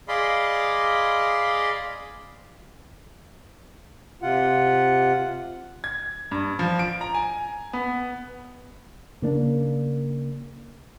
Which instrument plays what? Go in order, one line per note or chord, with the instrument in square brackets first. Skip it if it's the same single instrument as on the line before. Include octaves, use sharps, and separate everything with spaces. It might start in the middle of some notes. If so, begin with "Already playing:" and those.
[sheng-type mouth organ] G#4 D5 D#5 F5 B5 C6
[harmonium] C3 F4 F#5
[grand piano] G#6
G2
F3
D7
A#5
G#5
B3
[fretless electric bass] C#3 A#3 D4